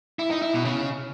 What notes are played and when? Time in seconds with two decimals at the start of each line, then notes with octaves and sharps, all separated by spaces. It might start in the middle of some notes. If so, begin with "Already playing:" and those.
0.19 E4
0.31 D#4
0.42 E4
0.54 B2
0.65 C#3